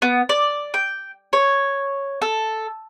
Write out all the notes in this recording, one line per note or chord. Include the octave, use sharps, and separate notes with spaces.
B3
D5
G5
C#5
A4